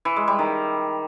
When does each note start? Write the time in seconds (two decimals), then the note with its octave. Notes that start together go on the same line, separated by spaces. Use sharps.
0.05 E3
0.16 G#3
0.28 G3
0.39 D#3